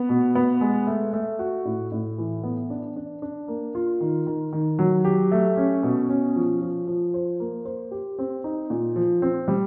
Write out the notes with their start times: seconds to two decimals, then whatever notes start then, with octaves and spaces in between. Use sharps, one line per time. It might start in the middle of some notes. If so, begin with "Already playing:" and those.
Already playing: B3
0.09 B2
0.35 B3
0.61 G#3
0.87 A3
1.13 A3
1.39 F#4
1.65 A2
1.92 A2
2.18 E3
2.43 B3
2.70 D4
2.96 D4
3.22 D4
3.48 A#3
3.75 F4
4.01 D#3
4.27 D#3
4.53 D#3
4.79 F#3
5.04 G4
5.31 A3
5.57 C#4
5.83 B2
6.09 C#4
6.36 F3
6.61 F3
6.87 F3
7.14 C5
7.40 A#3
7.65 C5
7.91 G4
8.19 C4
8.44 D#4
8.70 A#2
8.96 F3
9.22 C4
9.48 G3